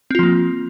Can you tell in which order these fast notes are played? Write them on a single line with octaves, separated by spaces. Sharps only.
C4 F4 F3 A#3